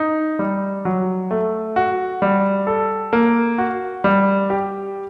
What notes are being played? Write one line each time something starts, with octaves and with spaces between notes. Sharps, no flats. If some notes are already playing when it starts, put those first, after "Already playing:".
Already playing: D#4
G3
F#3
A3
F#4
G3
A4
A#3
F#4
G3
G4